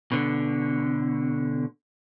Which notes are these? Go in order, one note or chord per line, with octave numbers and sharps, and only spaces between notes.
B2 D3